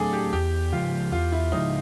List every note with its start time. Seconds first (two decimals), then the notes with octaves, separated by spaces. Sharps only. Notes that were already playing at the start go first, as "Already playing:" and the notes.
Already playing: F#3 A3 D4 G#4 A4 D5
0.13 G4
0.33 E2 G4
0.72 C#3 F3 G#3 F4
1.12 E2 F4
1.32 E4
1.52 C#3 F3 G#3 D#4